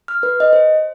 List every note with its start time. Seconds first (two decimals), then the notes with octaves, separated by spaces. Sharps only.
0.08 F6
0.23 B4
0.40 D#5
0.53 C5